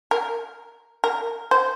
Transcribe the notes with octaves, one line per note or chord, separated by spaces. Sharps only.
A#4
A#4
C5